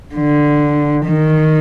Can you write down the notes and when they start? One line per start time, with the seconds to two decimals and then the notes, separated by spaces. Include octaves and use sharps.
0.15 D3
1.05 D#3